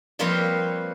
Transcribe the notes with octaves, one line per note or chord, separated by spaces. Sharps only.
F3 G3 A#3 C4 B4 C#5